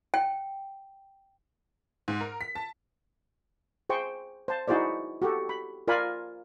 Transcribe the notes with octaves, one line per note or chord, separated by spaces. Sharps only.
G5
G#2
A#4
B6
A5
G#4 C5 G5 C#6
C5 A5
D#4 E4 F#4 G#4 C5 D5
F#4 G4 A4
B5
F4 A#4 D5 F5 G#5 B5